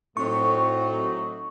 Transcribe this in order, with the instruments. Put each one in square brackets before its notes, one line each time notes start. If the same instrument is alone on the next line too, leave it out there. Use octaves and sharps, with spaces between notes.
[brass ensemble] A2 C4 [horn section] F#3 A3 D#4 [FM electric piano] C#6